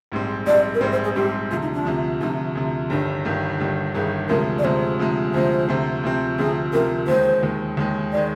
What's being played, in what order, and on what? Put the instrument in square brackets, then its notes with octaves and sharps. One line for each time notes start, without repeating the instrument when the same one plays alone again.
[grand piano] A#1 G#2 G3 C4
[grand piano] A#1 G#2 G3 C4 [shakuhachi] D5
[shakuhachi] A#4
[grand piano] A#1 G#2 G3 C4 [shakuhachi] C5
[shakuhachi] C5
G#4
[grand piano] A#1 G#2 G3 C4 [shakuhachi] G4
[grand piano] D2 C3 F3 [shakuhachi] F4
[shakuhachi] D#4
D4
[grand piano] D2 C3 F3
[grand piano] D2 C3 F3 [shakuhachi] D#4
[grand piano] D2 C3 F3
[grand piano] G1 G2 D#3 G3 [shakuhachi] D4
[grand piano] G1 G2 D#3 G3
G1 G2 D#3 G3
[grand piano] G1 G2 D#3 G3 [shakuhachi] G#4
[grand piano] D2 C3 F3 G#3 [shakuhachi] A#4
[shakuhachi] D5
[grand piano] D2 C3 F3 G#3 [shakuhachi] C5
[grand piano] D2 C3 F3 G#3
[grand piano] D2 C3 F3 G#3 [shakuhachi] C5
[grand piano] D2 C3 F3 C4
D2 C3 F3 C4
[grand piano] D2 C3 F3 C4 [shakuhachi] G#4
[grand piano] D2 C3 F3 C4 [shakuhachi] A#4
[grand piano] D#2 D#3 G#3 [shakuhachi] C5
[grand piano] D#2 D#3 G#3
D#2 D#3 G#3
[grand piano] D#3 G#3 [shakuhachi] D5